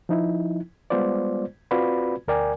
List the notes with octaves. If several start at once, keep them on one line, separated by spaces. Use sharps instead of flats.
F3 D#4 E4
G3 G#3 B3 F4 C5 D5
C4 F4 F#4 B4 D5 B5
D2 A#4 D5 G5 G#5